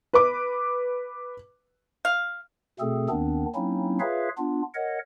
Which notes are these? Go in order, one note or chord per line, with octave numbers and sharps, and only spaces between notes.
B4 D6
F5
B2 A3 C4 G#4 A4
D#2 D#3 B3 C4 D4
F#3 A#3 C4 C#4 D#4 E4
F4 G#4 B4 C#5 E5 F5
B3 D4 F4
A#4 C#5 D#5 F#5